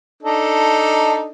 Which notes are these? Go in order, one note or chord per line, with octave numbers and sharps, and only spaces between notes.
D4 D#4 A4